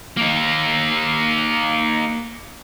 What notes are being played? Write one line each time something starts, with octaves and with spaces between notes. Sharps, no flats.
A#3 D#4